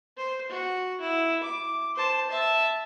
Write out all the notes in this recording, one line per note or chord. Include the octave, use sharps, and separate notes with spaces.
C5
F#4
E4
D6
C5 A5
E5 A5